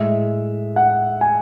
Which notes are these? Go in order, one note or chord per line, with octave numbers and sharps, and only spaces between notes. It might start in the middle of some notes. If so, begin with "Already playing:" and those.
Already playing: A2 G#3 E5
F#5
G#5